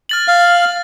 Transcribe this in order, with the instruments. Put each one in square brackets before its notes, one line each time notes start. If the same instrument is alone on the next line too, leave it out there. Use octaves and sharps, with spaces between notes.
[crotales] F6 A6 F#7
[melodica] F5